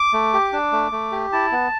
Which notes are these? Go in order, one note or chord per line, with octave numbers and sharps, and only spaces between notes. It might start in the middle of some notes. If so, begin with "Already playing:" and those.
Already playing: D6
A3
G4
D4
A3
A3
G4
E4 A5
B3